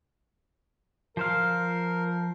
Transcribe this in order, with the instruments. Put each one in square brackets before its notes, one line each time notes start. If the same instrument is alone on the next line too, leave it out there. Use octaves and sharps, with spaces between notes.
[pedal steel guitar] F3 C5 F5 [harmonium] A#4